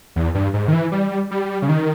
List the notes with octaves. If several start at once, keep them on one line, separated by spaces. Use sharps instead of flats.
E2
G2
G#2
D#3
E3
G3
G3
C#3
D#3